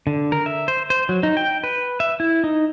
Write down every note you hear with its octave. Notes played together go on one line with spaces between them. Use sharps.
D3
A#4
E5
C5
C5
F#3
D#4
G5
B4
E5
E4
D#4